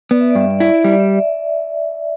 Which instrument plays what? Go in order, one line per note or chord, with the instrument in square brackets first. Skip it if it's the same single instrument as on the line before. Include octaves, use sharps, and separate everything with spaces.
[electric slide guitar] B3 [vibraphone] D5
[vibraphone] E5
[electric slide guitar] G2 [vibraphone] D5
[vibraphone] E5
D5
[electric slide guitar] E4 [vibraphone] E5
[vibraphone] D5
[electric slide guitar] G3 [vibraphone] E5
[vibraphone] D5
E5